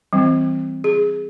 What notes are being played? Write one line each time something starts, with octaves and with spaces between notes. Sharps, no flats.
E3 G3 C4
G#4